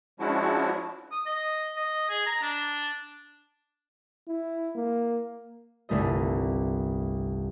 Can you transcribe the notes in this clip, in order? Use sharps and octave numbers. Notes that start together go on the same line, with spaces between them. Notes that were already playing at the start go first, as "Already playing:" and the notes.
F3 G#3 C#4 D4 E4 F#4
D#6
D#5
D#5
G#4
A#5
D4
E4
A#3
G1 C2 A3 A4 D#5